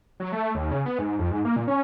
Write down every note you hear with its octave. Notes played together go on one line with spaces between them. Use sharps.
F#3
A3
D#2
C#3
B3
G#2
F2
G#2
A#3
A#2
C#4